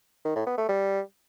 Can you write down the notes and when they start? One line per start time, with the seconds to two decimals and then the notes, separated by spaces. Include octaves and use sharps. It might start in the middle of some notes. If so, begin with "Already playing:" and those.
0.25 D#3
0.36 A2
0.47 B3
0.58 A3
0.69 G3